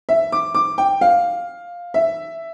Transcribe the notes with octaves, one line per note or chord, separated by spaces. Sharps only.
E5
D6
D6
G5
F5
E5